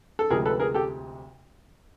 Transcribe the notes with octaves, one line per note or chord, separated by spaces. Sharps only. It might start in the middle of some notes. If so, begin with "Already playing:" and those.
A4
D2 C3 F3 G#3 G#4 A#4
A4 B4
G#4 A#4
G4 A4